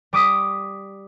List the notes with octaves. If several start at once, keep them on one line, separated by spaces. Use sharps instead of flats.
G3 D6 D#6 B6